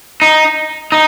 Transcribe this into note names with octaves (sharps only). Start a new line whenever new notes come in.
D#4
D#4